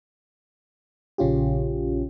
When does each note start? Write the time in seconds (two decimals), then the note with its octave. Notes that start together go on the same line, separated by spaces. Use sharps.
1.18 A#1 C#3 C#4 F4 G4